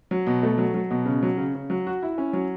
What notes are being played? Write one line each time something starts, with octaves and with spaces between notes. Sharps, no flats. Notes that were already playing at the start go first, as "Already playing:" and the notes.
F#3
B2
A3
F#3
F#3
B2
C#3
F#3
C#3
C#3
F#3
F#4
E4
C#4
F#3